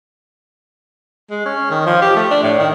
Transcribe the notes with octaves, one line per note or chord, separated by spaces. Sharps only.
G#3
C#4
D#3
F3
G4
A3
D4
A2
D#3